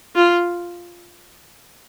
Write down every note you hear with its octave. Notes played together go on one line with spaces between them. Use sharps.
F4